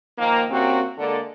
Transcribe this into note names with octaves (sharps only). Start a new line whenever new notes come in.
D#3 F3 A#3
C3 A#3 C4 C#4 F#4
D3 G#3 A#3 A4 D5